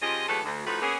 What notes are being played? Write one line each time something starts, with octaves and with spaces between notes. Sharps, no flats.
C#3 F3 F4 G4 D#5
D#2 E3 F#3 A3 G#4 A4
D2
A2 F3 A3 D#4 F#4 B4
A#3 B3 C#4 G#4